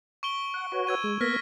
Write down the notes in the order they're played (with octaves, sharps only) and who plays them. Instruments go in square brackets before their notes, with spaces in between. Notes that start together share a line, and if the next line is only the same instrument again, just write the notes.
[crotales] C#6 D7 G7
[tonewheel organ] F#5
F#4 B4 C#5
[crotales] E6 G#6 D#7
[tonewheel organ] G#3
[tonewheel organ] A#3 B3 G#6 [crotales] F6 A#6 B6